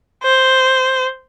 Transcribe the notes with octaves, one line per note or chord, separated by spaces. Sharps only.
C5